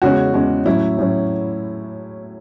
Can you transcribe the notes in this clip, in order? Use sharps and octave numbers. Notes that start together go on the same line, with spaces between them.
E2 C#3 G#3 C#4 F#4
E2 C#3 G#3 C#4
A2 F#3 C#4 E4
A2 F#3 C#4